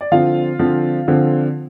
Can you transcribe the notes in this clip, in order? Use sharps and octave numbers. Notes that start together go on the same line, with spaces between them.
D5
D3 F3 C4 F4 F5
D3 F3 C4
D3 F3 C4